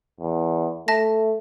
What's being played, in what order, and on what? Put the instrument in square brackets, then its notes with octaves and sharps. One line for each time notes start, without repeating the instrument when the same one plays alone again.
[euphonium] E2
[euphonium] A3 [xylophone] E5 A5 A#6